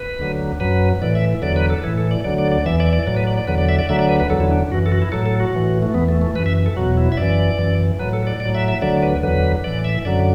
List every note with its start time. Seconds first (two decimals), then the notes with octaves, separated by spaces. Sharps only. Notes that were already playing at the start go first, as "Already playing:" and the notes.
Already playing: B4
0.19 D2 D3 F#3
0.60 F#2 F#3 B4
1.02 A2 E3 D5
1.15 E5
1.42 E2 D3 F#3 D5
1.56 B4
1.70 A4
1.84 A2 E3 E4
1.98 A4
2.11 D5
2.24 D2 D3 F#3 D5
2.38 D5
2.52 D5
2.66 E2 E3 E5
2.80 D5
2.93 D5
3.07 A2 F#3 D5
3.17 B4
3.27 D5
3.37 D5
3.47 E2 D3 F#3 B4
3.58 D5
3.69 E5
3.79 D5
3.89 D2 D3 F#3 E5
3.99 D5
4.09 B4
4.20 B4
4.29 E2 D3 F#3 A4
4.40 E4
4.51 D4
4.71 F#2 F#4
4.74 E3
4.86 A4
4.92 F#4
5.02 E4
5.12 A2 F#3 A4
5.26 A4
5.40 F#4
5.53 A2 E3
5.82 A3
5.94 E2 E3 B3
6.08 A3
6.21 A3
6.35 E3 B4
6.38 F#2
6.46 E5
6.66 A4
6.76 E2 B2 F#3 F#4
6.97 E4
7.12 E5
7.17 F#2 E3 D5
7.59 F#2 E3
7.99 A2 F#3 B4
8.13 A4
8.27 D5
8.40 A2 D5
8.45 F#3
8.55 E5
8.68 E5
8.82 D2 D3 F#3 D5
9.02 B4
9.23 E2 D3 F#3 B4
9.64 A2 E3 D5
9.84 E5
10.05 F#2 D3 F#3 D5